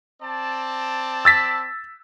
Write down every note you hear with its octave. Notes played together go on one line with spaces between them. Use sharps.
C4 D5 A5
E6 A6 B6